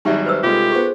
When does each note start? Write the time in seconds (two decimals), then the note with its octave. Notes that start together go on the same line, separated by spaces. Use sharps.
0.05 G#1 F#3 G3 D#4 G4 E5
0.26 B4 C5 E6
0.43 C2 G#3 F4 G4 A4
0.71 B3 G#4 C5 C#6